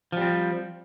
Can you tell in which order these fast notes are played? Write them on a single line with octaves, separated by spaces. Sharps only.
F3 G3 C4